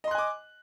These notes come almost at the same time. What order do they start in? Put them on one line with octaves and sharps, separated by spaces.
D#5 C6 F#6 G#5 D6